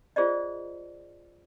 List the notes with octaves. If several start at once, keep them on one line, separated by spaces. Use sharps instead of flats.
F4 G#4 C5 D5 D#5